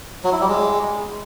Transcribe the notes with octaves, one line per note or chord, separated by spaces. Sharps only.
F#3
E4
G3
G#3